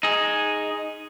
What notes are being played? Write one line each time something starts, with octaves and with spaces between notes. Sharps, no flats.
D#4 G#4